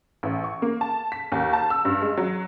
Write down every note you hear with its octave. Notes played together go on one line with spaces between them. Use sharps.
A1
C#6
A#3
A5
B6
D#2
A5
E6
G2
G#3
F#3